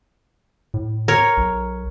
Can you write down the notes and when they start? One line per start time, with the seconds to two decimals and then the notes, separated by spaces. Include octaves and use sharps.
0.74 A2
1.08 A#4 C#5
1.37 B1